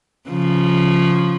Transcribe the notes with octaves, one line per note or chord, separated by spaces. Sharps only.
C#3 F3